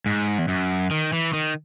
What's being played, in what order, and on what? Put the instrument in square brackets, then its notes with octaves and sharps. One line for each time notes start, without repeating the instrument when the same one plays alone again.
[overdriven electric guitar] G#2
E2
F#2
D#3
E3
D#3